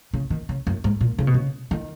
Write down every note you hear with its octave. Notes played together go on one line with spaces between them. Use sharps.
C#3
D#3
C#3
F#2
G#2
A#2
C#3
B2
C#3
D#3